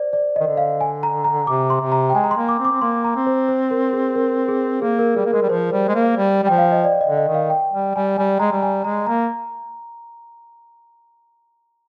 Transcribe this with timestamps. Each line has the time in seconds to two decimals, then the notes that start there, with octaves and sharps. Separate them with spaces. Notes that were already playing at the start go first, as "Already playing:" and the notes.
Already playing: C5 D5
0.13 D5
0.36 D#5
0.40 D#3
0.47 D3
0.57 F5
0.81 G#5
1.03 A#5
1.24 A#5
1.47 C3 D6
1.70 C6
1.81 C3
1.92 A#5
2.10 G5
2.14 G#3 G#5
2.24 A#5
2.31 C6
2.37 A#3
2.49 D6
2.59 C4
2.65 D6
2.71 C4
2.81 A#3 C6
3.04 A#5
3.16 C4
3.26 C5
3.48 C5
3.71 A#4
3.93 G#4
4.15 A#4
4.48 G#4
4.82 A#3 G#4
4.99 A#4
5.16 G3 G#4
5.25 A#3
5.33 G#3 A#4
5.42 G3
5.49 F3 C5
5.72 G3
5.88 G#3
5.95 A#3
6.17 G3
6.43 G3
6.47 F3 G5
6.58 F5
6.72 D#5
6.84 D5
7.01 D#5
7.06 D3
7.17 D#5
7.28 D#3
7.34 F5
7.50 G5
7.73 G3
7.95 G3 G#5
8.18 G3 G#5
8.40 G#3 A#5
8.52 G3
8.63 G#5
8.84 G#3 A#5
9.07 A#3 A#5